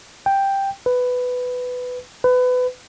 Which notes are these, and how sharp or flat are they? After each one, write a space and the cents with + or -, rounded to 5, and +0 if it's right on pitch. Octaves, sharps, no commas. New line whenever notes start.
G5 +5
B4 +10
B4 +25